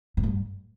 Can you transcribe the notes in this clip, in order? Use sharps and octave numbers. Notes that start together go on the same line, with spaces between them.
G#2
G2